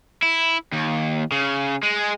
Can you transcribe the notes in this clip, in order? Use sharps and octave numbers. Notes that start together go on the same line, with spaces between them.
E4
D#2
C#3
G#3